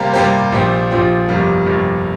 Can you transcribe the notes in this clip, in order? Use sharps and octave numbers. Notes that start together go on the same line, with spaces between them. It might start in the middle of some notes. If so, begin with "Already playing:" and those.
Already playing: C3 G3 A#3 G4 C5
C3 G3 A#3 G4 C5
A#1 A#2 F3 C4 G4
A#1 A#2 F3 C4 G4
G1 F2 C3 G3 A#3
G1 F2 C3 G3 A#3